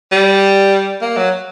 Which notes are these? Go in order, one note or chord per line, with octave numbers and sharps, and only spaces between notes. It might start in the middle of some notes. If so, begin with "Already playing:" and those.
G3
A#3
F#3